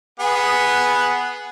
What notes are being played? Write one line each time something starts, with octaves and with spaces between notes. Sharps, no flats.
B3 G#4 F#5